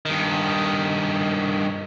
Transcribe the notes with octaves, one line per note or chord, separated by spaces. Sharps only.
G2 D#3